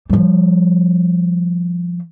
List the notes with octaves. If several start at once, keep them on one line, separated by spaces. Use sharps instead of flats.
F3 G3